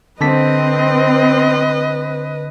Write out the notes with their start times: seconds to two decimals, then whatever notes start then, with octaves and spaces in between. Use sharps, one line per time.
0.21 D3 C4 B4 D#5 A5 B6